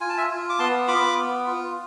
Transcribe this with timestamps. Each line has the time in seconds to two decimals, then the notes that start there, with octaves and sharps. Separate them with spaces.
0.01 F4 G#5
0.09 A5
0.18 E5 G#5
0.30 F4
0.49 D6
0.59 B3 A5 C6
0.88 F4 B5 D6
1.17 B3
1.47 F4